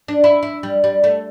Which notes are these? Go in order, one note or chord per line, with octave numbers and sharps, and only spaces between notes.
D4
E4
E4
G3
G3
A3